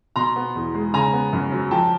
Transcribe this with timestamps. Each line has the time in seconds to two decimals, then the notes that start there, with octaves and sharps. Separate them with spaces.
0.16 B2 A#5 C6
0.36 B3
0.55 E2
0.75 G#3
0.94 C#3 G#5 A#5
1.13 B3
1.33 F#2
1.52 F#3
1.71 F3 G5 A5